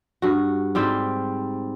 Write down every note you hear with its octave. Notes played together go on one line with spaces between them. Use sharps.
G2 F#4
G#2 G3 C4 G5